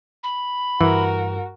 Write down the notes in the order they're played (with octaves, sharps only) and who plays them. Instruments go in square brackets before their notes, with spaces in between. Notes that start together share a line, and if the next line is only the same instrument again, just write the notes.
[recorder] B5
[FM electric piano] G2 [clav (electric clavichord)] E3 [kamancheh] F#4 A#4